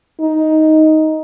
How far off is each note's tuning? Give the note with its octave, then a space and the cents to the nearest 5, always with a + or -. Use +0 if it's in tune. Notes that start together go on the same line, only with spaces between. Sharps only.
D#4 +10